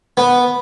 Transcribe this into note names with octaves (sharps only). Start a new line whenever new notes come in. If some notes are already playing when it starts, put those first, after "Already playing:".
B3